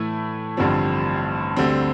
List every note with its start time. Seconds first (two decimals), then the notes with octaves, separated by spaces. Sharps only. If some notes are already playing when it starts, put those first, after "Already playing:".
Already playing: A2 E3 A3 E4
0.57 A1 G2 D3 F3 C4
1.57 D2 D3 G3 C4